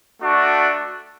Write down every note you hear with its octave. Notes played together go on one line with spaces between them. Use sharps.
A3 D4 F#4